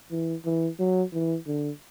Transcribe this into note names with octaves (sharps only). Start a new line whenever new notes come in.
E3
E3
F#3
E3
D3